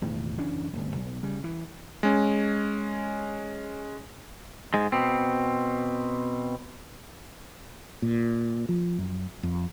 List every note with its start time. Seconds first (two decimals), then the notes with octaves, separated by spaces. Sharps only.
0.02 E1 E2 A2 D#3
0.38 F#1 E3 C#4 D4
0.73 D1 G1
0.96 B1
1.23 C#3 G3
1.44 E3
2.03 G#3 C#4
4.74 G#2 G#3
4.92 B2 C4
8.02 A#2
8.69 F3
8.98 F#2
9.43 F2